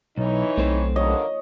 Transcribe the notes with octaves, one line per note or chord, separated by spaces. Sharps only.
B1 E3 D#4 C#5
B1 A3 C4 C5
G2 D3 A#3 C#5 D#5